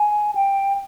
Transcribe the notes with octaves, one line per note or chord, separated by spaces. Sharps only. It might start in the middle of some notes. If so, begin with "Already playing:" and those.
Already playing: G#5
G5